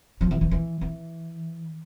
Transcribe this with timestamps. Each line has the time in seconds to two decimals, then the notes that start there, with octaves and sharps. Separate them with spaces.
0.21 F3
0.31 E3
0.41 E3
0.51 E3
0.81 E3